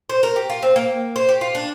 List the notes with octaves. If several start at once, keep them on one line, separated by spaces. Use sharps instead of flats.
C5
A#4
G4
F4
C4
A#3
C5
G4
F4
D4